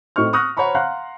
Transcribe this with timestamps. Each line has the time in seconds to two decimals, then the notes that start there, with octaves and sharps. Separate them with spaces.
0.16 A2 C4 D#4 C#6 F6
0.33 C#6 D#6 F6 F#6 A#6
0.57 C5 C#5 F#5 A#5 B5 C#6
0.75 F5 F#5 A#5 C6 F#6